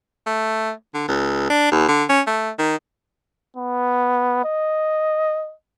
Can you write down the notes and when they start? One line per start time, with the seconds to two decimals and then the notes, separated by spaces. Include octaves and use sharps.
0.27 A3
0.94 D3
1.09 C#2
1.50 D4
1.72 D#2
1.88 D3
2.09 C#4
2.27 A3
2.59 D#3
3.56 B3
4.45 D#5